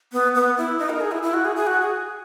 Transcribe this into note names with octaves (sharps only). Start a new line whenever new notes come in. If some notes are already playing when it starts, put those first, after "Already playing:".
B3
B3
E4
D#4
A#4
G#4
E4
E4
F#4
G#4
G#4
F#4
G#4